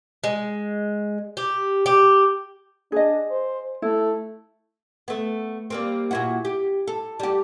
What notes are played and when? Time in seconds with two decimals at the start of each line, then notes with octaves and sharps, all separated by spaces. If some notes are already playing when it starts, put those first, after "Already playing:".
0.24 G#3
1.37 G4
1.86 G4
2.92 D4 G#4 D#5
3.30 C5
3.82 A3 E4
5.08 A3 B3
5.70 G3 A#3 C4
6.11 A#2 E4 F#4
6.45 G4
6.87 A4
7.20 G3 G4